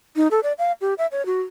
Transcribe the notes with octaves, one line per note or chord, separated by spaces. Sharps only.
D#4
A4
D5
F5
G4
E5
C#5
F#4